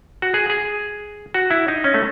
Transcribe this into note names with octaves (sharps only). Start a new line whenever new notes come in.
F#4
G#4
G#4
F#4
E4
D#4
C#4
A3